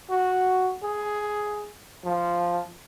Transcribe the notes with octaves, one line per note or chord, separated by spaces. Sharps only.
F#4
G#4
F3